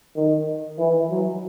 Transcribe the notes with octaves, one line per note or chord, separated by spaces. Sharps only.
D#3
E3
F#3